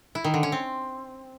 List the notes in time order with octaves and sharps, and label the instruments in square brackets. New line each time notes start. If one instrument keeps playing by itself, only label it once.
[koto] E4
D#3
D3
C#4
C4